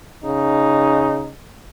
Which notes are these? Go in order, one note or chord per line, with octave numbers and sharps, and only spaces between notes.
C#3 D#4